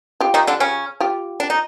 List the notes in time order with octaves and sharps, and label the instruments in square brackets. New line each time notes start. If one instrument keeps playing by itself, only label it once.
[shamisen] F4 G4
[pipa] D#3 D#4
D3 D4
C#3 C#4
[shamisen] F4 G4
[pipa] D4
D#4